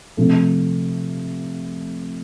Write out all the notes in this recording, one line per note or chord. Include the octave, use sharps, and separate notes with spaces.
C3 F3 A3